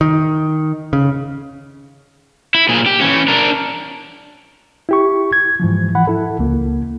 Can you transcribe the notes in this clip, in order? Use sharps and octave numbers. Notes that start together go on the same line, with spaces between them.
D#3
C#3
E4
A#2 G#4
G4
E3 C#4
D4 A#4
E4 G4 C#6
G#6
G#2 E3 F3
E3 F#5 B5
E4 A4
C#2 A#3